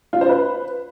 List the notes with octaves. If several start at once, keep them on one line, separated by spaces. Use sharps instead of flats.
F4
C5
B4